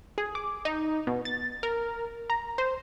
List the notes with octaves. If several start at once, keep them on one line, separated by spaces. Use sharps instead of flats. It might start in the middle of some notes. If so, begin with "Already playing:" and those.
G#4
D6
D#4
B2
A6
A#4
A#5
C5